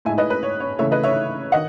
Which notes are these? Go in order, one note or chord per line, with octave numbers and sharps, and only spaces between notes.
A2 G#3 D#4 E5 G#5
B4 D#5
B4
C#5
C#5
C#3 E3 A3 C#5 E5
B4 D#5
C#5 E5
D#3 D#5 F#5